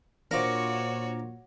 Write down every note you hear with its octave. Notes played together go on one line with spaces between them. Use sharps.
A#2 D4 F4 F#4 A#4 C5 C#5 D6